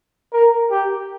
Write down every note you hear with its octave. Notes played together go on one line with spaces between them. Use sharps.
A#4
G4